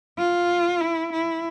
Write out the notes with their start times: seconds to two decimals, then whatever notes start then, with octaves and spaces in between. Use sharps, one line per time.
0.18 F4
0.81 E4
1.13 E4